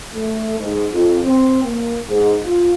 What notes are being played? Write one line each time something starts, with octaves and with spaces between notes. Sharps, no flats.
A3
G#2
F2
C4
A#3
G#2
F4